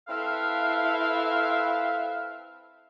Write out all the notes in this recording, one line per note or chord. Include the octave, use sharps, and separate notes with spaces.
C4 E4 A4 B4 E5 F5